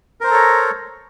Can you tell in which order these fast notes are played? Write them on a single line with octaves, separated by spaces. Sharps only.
A#4 C5 A#5 A4 C#5